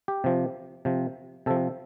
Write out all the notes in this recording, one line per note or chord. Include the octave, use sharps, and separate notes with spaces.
G4
C3 F3
C3 F3
C3 F3 A4